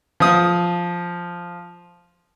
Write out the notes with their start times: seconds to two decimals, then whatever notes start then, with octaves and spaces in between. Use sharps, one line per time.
0.20 F3 D#6